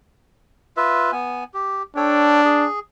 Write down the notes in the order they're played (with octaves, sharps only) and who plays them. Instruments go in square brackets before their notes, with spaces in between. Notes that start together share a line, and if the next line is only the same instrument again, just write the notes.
[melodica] F4 B4 E5
B3 G#5
G4
[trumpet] D4 [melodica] A4 C#5 G5
[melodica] G#4